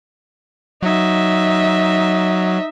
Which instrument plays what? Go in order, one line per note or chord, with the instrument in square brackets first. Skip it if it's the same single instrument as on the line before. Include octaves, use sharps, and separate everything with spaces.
[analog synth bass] F#3 [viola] D#4 E5